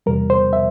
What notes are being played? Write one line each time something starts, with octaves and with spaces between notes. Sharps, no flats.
E2 C3 G3 A#4
C5
E5